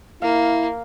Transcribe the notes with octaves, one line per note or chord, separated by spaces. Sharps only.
A#3 E4 F5